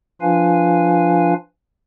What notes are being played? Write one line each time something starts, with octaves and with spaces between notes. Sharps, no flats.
F3 D4 F4 B4 F5 G#5